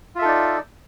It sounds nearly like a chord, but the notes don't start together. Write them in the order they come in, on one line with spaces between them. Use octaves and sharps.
F4 E5 A4 D#4 D5